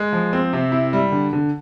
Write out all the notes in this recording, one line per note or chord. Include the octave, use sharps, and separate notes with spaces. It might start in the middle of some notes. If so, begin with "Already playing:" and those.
Already playing: G#3
F3
C4
C3
E4
G3
D3
D3